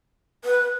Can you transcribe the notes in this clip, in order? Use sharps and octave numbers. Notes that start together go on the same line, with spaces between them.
B4